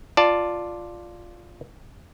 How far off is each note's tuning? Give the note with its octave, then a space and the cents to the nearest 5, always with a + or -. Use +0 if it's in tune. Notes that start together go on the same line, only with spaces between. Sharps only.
F4 +0 D5 +5 A5 +5